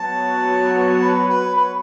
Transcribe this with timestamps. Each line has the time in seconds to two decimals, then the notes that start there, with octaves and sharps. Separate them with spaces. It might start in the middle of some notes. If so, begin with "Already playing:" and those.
Already playing: F#3 B3 F#4 C#5 A5
1.02 B4
1.29 B4
1.57 B4